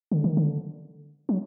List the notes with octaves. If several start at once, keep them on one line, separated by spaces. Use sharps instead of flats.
D3
D#3
D3
F#3